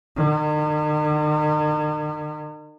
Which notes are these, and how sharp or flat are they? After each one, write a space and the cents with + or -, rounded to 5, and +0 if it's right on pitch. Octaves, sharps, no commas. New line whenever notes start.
D#3 -45